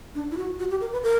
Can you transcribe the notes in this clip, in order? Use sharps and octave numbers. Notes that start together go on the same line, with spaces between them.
D4
E4
F#4
F#4
G4
A#4
B4
A#4